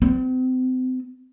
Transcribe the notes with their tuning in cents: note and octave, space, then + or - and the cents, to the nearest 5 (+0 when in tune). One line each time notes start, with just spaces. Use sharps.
C4 -35